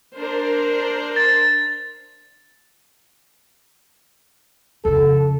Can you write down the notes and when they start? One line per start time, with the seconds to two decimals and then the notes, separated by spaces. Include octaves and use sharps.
0.17 D4 A#4 C5
1.16 A6
4.85 F2 C#3 A4